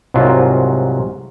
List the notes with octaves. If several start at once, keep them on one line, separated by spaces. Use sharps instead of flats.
C2 G#2 F#3 A#3 F4